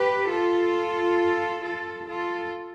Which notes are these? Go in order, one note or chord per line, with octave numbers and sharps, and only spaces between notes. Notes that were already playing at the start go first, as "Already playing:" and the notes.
Already playing: G4 B4
F4 A4
F4 A4
F4 A4